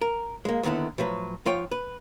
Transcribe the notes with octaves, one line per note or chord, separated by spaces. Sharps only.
A#4
G#3 A#3
D#2 D3 D#3 B3 E4
A2 F3 F#3 B4
G#2 F3 F4 C#5 G5
B4